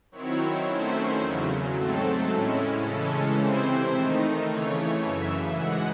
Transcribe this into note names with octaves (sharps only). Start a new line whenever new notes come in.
D#3 F#3 C4 E4 C#5
D#3 F#3 A3 C#4 E4 C5
E2 C#3 F#3
G#2 F#3 A3 C4 A4
A2 G#3 C#4 E4
C#3 E3 G#3 C#4 A4
C3 E3 C4 E4 C5
D#3 A3 D#4
C#3 E3 A3 C#5
F#2 C#3 E3 E5
G#2 E3 G#3 F#5